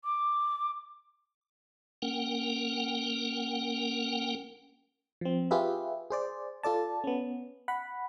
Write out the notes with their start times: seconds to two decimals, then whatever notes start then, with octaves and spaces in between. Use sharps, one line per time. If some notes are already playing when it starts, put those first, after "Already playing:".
0.04 D6
2.02 A#3 C#4 A#4 F#5 G5
5.21 F3 C4
5.51 F4 G4 G#4 B4 E5
6.10 G#4 C5 D5
6.63 F4 A4 D5 A5
7.04 B3 C#4
7.68 F#5 B5